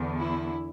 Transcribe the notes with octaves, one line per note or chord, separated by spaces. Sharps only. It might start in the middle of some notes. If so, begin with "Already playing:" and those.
Already playing: E2 D3
E4